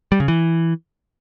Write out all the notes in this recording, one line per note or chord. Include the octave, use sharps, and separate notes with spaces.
G3
C#3
E3